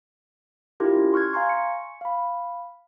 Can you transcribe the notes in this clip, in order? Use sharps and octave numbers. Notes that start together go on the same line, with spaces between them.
D4 E4 F4 G4 A#4
C#4
C6 C#6 F6 F#6 G#6
F5 G#5 A#5 C6 C#6
C#6 C#7
F5 B5